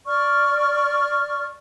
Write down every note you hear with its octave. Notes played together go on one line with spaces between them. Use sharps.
D5 C#6 F6